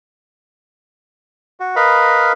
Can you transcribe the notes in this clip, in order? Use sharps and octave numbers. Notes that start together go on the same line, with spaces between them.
F#4
A#4 B4 D#5 F5 B5